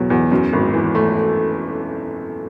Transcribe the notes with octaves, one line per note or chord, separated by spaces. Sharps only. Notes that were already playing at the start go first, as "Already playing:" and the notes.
Already playing: E2 B2 F#3
E2
F#2
G#1
E3
A3